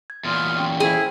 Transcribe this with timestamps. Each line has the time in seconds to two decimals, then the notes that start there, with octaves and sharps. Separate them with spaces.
0.10 G#6
0.24 E2 A#2 C6 D#6 F6
0.58 C#4 G5 C#6
0.80 E4 G#4 C5 G5